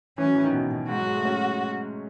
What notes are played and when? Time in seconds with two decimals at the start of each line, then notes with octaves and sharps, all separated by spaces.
0.18 E3 C#4
0.26 F#3
0.35 E3
0.44 D#3
0.53 B2
0.71 B2
0.89 G#2 F#4
0.98 F#3
1.07 G#3
1.17 A3
1.25 C#4